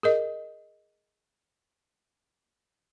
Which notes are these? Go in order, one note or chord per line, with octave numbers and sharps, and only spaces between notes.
G#4 A#4 D#5